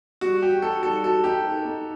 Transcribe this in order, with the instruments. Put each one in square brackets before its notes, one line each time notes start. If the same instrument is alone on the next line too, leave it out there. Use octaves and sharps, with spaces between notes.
[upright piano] G3 [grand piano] F#4
[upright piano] F#4 [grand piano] G4
[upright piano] D#4 [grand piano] A4
[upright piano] G3 [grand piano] A4
[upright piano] F#4 [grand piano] A4
[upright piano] D#4 [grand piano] G4
[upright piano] A4
D#4